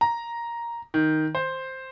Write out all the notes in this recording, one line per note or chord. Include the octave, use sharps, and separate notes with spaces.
A#5
D#3
C5